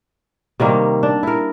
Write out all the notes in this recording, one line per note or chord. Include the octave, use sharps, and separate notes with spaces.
C3 D#3 G3 A#3
D4
E4 A#4